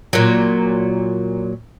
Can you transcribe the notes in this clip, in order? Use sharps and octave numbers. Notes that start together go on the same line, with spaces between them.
A#2 F#3